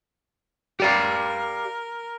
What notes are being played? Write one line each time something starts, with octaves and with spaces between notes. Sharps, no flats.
G4 A#4 D5 F5